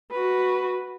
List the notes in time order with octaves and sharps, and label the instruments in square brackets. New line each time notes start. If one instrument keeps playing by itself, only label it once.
[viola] F#4 B4